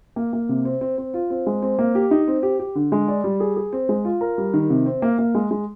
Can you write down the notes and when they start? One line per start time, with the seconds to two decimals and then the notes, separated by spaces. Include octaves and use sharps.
0.16 A#3
0.33 A#3
0.49 C3
0.65 C4
0.81 C4
0.98 C4
1.14 F4
1.30 C4
1.47 G#3
1.62 C4
1.79 A#3
1.95 G4
2.11 D#4
2.28 C4
2.43 G4
2.59 G4
2.75 D3
2.92 G#3
3.08 D5
3.24 G3
3.40 G#4
3.57 G#4
3.73 C4
3.89 G#3
4.05 F4
4.21 A#4
4.38 G3
4.54 D#3
4.70 C3
4.86 C4
5.02 A#3
5.19 A#3
5.35 G#3
5.51 G#3